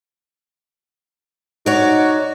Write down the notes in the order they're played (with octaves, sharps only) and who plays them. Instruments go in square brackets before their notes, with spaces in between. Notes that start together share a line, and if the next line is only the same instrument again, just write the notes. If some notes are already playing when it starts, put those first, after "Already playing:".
[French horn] D#4 [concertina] F#4 [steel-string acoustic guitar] C#5 D5